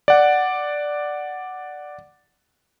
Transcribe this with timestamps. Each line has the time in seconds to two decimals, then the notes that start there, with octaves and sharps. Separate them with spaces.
0.08 D5 F#5